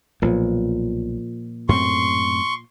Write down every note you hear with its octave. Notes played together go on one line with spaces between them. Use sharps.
B1 A#2 F3
F#2 A2 C4 C6 C#6